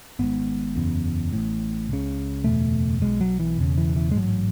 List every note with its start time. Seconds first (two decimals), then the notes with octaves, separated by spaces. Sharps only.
0.19 G#1 G#2 B3
0.75 F#1 E2 C#3
1.33 A1 A2
1.89 C#2 C#3
2.44 F#1 E2 B2 A3
3.02 B1 B2 G#3
3.21 F#3
3.40 E3
3.59 E1 E2 C#3
3.78 E3
3.96 E3
4.11 G#3
4.15 A1 G#2 F#3